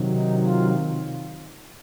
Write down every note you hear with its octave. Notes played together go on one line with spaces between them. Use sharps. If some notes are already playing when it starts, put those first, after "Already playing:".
Already playing: C3 D#3 F#3
D#4
F4